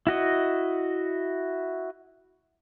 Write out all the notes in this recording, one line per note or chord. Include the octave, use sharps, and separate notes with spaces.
E4 F#4 D#5